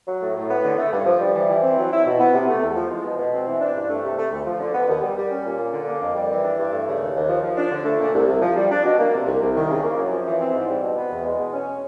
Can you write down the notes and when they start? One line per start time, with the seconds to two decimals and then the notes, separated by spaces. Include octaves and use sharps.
0.08 F#3
0.21 A2
0.36 A2
0.50 B3
0.64 D3
0.79 A3
0.92 G2
1.06 F3
1.21 G3
1.35 E3
1.49 E3
1.63 C4
1.78 F#3
1.92 E4
2.06 B2
2.20 B3
2.34 C3
2.48 A3
2.63 E2
2.76 F3
2.90 G#3
3.04 B2
3.19 B2
3.33 C4
3.47 E3
3.61 D4
3.75 G2
3.89 A3
4.04 C3
4.17 A3
4.32 D2
4.46 F3
4.61 D3
4.74 B3
4.89 D#2
5.02 G3
5.17 G3
5.31 C#4
5.45 A#2
5.59 A#3
5.73 D3
5.88 A#3
6.01 F2
6.15 G3
6.30 E3
6.44 D4
6.59 G2
6.72 A3
6.87 C#3
7.01 D#2
7.15 D#2
7.29 F3
7.43 F3
7.58 D4
7.71 D3
7.85 A3
8.00 A#2
8.14 C2
8.28 C2
8.42 F3
8.56 G3
8.71 D4
8.85 B2
8.99 A#3
9.13 C3
9.26 C2
9.42 C2
9.56 D#3
9.70 C#3
9.83 A#3
9.97 F#2
10.12 F3
10.26 E3
10.41 C4
10.54 G#2
10.69 G3
10.83 B2
10.97 B3
11.11 E2
11.25 G#3
11.39 B2
11.54 C#4